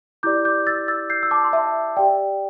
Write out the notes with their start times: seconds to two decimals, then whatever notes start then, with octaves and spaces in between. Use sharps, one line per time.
0.23 E4 G4 D5 D6 G6
0.45 D6 G6
0.67 E6 A6
0.88 E6 A6
1.10 G6 C7
1.23 E6
1.31 A5 D6
1.44 C6
1.53 E5 A5
1.97 G4 D5 G5